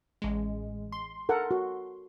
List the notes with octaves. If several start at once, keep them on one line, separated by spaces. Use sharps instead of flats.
A1 G#3
C6
A4 A#4 F#5
F#4